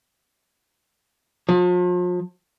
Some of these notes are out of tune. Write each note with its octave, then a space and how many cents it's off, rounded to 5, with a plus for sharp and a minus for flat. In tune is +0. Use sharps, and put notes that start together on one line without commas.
F3 +40